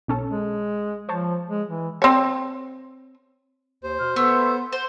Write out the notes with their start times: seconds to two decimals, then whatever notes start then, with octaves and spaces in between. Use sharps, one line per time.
0.08 B1 C#4 A4
0.31 G#3
1.09 F3 C5 C#5 A5
1.50 G#3
1.69 E3
2.02 C4 C#5
3.84 D#2 C5
4.00 B2 C6 F6
4.16 A3 B3 A4 B4 C6
4.73 C5 F#5